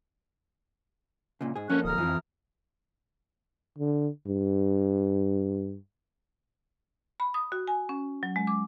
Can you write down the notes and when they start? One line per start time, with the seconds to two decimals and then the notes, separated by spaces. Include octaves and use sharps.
1.41 C#2 A#2 C#3
1.56 G#2 G#4
1.70 F2 A#3 C#4 A4 C#6 F#6
1.84 D1 A#5 D#6 F6
1.98 F2 E3 F3 E4
3.78 D3
4.27 G2
7.20 B5
7.34 D#6
7.52 F#4
7.68 G#5
7.89 C#4
8.23 F#3
8.36 G#3
8.47 D6